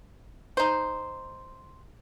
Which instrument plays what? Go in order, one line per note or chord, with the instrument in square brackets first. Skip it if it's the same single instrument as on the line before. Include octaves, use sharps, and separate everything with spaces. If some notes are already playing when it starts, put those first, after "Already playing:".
[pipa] D#4 C5